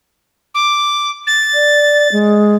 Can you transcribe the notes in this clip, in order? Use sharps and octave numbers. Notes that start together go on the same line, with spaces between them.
D6
A6
D5
G#3